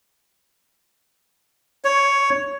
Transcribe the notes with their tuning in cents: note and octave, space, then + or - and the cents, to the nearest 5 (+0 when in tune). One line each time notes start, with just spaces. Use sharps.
C#5 +5